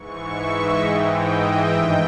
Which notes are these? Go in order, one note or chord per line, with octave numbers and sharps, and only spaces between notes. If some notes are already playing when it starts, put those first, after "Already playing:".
Already playing: G#2 E3 C#6
E5
D#5
G#2 E3 G5
D#5
E5
G2 D#3 G5